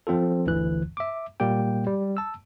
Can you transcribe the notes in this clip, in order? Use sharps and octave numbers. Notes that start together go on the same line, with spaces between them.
F3 C4 F4 A4
G1 D2 D3 E3 F#6
E5 D6
A#2 G3 A#3 G4 G5
G3
A5 E6